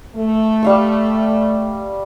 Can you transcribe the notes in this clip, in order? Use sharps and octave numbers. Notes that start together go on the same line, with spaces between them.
A3
G3 F5 C#6